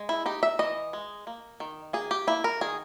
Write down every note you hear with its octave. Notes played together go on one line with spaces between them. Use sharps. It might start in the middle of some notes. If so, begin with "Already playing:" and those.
Already playing: G#3
E4
D#4 G4
E5
E3 D#5
G#3
A#3
D#3
A#3 G#4
G4
A#3 E4
A#4
D#3 G#4